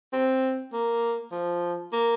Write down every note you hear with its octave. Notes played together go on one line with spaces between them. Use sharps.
C4
A#3
F3
A#3